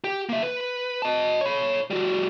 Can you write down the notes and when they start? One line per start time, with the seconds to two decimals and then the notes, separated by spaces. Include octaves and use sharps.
0.04 G4 G5
0.29 A#3 E5
0.43 B4
1.02 D#5 A5
1.41 C#5 B5
1.90 G3 F#4